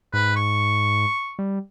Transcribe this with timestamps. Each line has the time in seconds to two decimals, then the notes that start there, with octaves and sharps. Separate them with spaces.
0.14 G#2 B4
0.36 C#6
1.39 G3